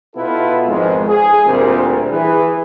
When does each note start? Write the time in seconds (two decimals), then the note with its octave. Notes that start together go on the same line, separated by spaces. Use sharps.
0.16 B2 B3 E4 F4 A4 B4
0.66 G#1 F2 G#3
1.08 G#4
1.45 D2 A#2 G3 C4 G#4 A#4
2.11 E3 G#4 B4